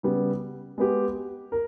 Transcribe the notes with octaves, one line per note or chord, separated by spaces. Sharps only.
C#3 G3 B3
G#3 B3 G4
A#4